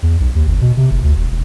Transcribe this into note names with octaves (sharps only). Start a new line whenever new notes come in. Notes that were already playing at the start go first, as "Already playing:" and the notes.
E2
B1
D#2
G1
B2
C3
F#1
D2
E1
E1